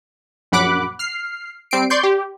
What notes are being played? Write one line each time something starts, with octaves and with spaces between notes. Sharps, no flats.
A#1 F#2 F#5 B5 D6 F#6
F6 C7
G3 C4 C7 D7
D5 C6 C#6 G6
G4